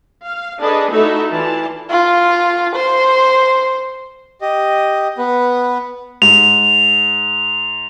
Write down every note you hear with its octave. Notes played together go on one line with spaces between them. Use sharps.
F5
D4 G#4 A4 B4 D5 D#5
A3 D#4 E4 F#4 A4 E5
E3 F4 D5 A5
F4
C5
G4 D#5
B3 B4
G#2 F7